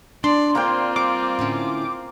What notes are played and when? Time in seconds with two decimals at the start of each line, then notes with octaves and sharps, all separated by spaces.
0.24 D4 D5 C6
0.55 D3 A#3 C4 F4 C5 D5 G5 A#5
0.96 G3 C6 D6
1.39 A2 D3 C#4